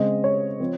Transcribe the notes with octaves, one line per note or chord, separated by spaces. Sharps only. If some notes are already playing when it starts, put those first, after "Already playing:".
Already playing: C#3 G#3 C4 D#5
C#5
F3 C4